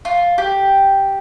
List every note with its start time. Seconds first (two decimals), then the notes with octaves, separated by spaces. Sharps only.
0.05 F4
0.38 G4